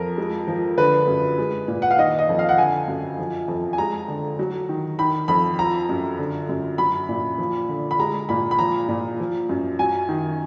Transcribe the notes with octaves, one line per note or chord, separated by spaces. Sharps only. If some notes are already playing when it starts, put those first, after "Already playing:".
Already playing: F2 F3 A#4
G#3
F3
D3 B4
F#2
G#3
A#2
F#5
F5
D#3 D#5
D#5
F2
F5
F#5
D3 G#5
F#2
F3
F2
G#5
G#3 A#5
D3
F#3
D#3
D#3 B5
F2 B5
F3 A#5
F#2
D3
F#2
F#3 B5
A#2
F3
D3
B5
G#3 A#5
A#2 B5
B5
F3 A#5
A#2
F3
F#2
F#3 G#5
D#3